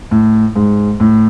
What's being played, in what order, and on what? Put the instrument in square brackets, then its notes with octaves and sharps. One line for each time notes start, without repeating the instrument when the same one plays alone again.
[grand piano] A2
G#2
A2